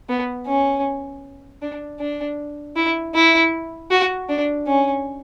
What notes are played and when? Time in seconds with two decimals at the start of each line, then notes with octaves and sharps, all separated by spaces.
0.09 B3
0.47 C#4
1.62 D4
2.00 D4
2.76 E4
3.15 E4
3.91 F#4
4.29 D4
4.67 C#4